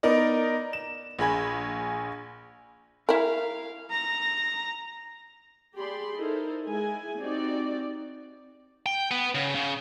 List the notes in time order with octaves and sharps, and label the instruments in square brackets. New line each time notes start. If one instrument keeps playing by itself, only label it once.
[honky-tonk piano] B3 D#4 A#4 D5
E7
A#1 G#4 B5 G#6
[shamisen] E4 A#4 [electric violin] F5
[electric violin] A#5 A#6
[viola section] G4 G#4 D5 B5 C6
D#4 E4 A4 A#4 C5
G#3 E4 G#5
C4 D#4 F#4 G4 D5
[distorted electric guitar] G5
B3
C#3
C#3